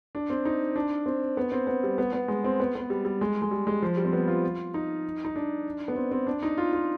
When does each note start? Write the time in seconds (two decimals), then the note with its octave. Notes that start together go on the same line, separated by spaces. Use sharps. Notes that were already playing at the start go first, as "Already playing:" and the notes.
0.15 D4
0.30 C4
0.45 D#4
0.76 D4
1.06 C4
1.37 B3
1.52 C4
1.67 B3
1.83 G3
1.98 B3
2.13 B3
2.28 G#3
2.44 C4
2.60 B3
2.75 B3
2.90 G3
3.05 G3
3.21 G#3
3.42 G#3
3.51 G3
3.67 G#3
3.82 F3
3.97 G3
4.05 C4
4.13 B3
4.27 F4
4.74 D#4
5.25 D#4
5.36 D4
5.88 B3
5.96 C4
6.11 C4
6.27 D4
6.43 D#4
6.58 F4
6.73 F4